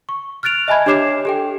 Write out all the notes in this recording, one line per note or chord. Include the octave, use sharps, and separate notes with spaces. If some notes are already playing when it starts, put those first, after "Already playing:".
C#6
F6 F#6 A6 D7 F7
D#5 E5 G#5 A5 B5 G#6
D4 G4 C#5 D6 C7 E7
G4 A4 G5